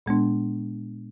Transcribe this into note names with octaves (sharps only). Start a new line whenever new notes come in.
A#2 G#3 B3 D4